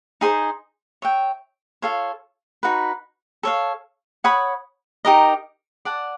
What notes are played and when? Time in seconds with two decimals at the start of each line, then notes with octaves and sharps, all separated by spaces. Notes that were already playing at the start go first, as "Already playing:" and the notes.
0.21 D#4 G#4 C5
1.02 C#5 E5 G5
1.82 F4 A4 C#5 F5
2.63 D#4 F#4 B4
3.43 A4 C#5 F5
4.24 C#5 F#5 B5 D#6
5.05 D#4 G4 A#4 D#5
5.85 D5 F#5 A5